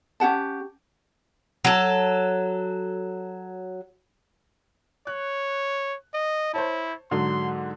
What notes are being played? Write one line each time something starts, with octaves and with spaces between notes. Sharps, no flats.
C#4 G4 F#5 A5
F#3 A4
C#5 F#6
D#5
E4 C5 C#5 A5
G#2 D3 F#3 C6